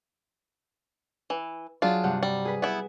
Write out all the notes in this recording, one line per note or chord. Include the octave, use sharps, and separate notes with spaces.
E3
F#3 D4 F4 G#4
G2 C3 F#5
G3
G#4 B4
B3 E4